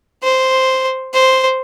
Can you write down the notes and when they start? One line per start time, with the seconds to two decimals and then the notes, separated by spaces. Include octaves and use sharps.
0.23 C5
1.14 C5